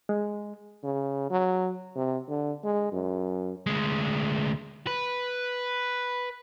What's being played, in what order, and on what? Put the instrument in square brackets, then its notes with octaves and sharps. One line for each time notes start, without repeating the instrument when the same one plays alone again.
[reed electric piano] G#3
[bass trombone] C#3
F#3
C3
D3
G#3
F#2
[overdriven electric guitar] D2 G#3
B4